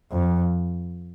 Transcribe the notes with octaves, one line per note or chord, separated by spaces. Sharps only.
F2